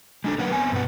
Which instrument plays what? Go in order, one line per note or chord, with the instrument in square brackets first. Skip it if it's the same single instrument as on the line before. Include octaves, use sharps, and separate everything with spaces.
[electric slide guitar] G#3 D4 A4
D3 F#3 A#3 A#4 B4 F#5
B3 C4 C5 G#5
G2 B2 B3 F#5